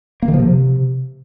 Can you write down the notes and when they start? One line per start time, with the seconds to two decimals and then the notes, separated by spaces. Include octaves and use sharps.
0.22 A#3
0.28 D#3
0.34 F3
0.39 C3